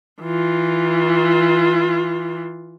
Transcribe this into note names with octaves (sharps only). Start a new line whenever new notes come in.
E3 F4